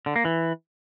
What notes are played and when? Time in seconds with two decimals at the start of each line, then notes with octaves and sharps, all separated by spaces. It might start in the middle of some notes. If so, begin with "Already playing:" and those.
0.06 D3
0.16 A#3
0.25 E3